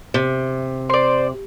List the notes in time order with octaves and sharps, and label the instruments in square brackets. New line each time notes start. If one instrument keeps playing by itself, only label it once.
[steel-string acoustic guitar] C3
[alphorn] C5 [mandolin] D5 C6